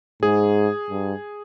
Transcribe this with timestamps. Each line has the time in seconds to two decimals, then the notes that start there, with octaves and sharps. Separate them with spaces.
0.22 G#2 G#4
0.90 G2